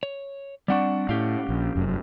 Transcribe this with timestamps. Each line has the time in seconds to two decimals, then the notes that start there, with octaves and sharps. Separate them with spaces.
0.03 C#5
0.68 G3 C4 D4 D5 F#5 C#6
1.09 A2 C#4 G4 F5
1.49 A#1
1.75 F1 F#2